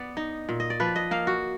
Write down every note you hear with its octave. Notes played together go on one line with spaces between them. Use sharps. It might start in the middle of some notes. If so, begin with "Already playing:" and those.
Already playing: B3 D5
D#4
A#2
D#5
D5
F3 B4
D#5
A#3 F5
F#4